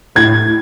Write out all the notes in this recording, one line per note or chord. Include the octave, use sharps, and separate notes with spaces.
A2 G#6